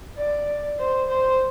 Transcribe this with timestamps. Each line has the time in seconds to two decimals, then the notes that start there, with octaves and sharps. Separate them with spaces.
0.17 D5
0.79 C5
1.08 C5